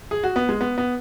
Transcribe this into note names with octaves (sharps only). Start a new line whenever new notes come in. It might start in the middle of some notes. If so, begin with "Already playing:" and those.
G#4
F#4
B3
G#3
B3
B3